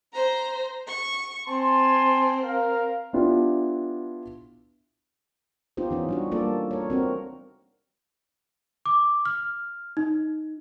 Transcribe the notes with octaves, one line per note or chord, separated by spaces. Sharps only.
C5 A#5
C#6
C4 G#5 A5 C6
A#4 F5
B3 D4 E4 F4 G4
B3 D#4 F4 G4 C5
E3 C#4 D#4
G3 D4 F#4
G3 A#3 F4 A4 D5
A#4 C#5
C4 F#4 A#4
D6
F6
D#4